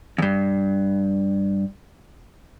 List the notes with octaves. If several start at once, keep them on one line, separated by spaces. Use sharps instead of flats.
E2 G2